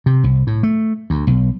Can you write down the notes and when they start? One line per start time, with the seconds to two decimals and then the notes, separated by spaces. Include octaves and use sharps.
0.06 C3
0.24 C2
0.47 A2
0.63 A3
1.10 D2
1.27 B1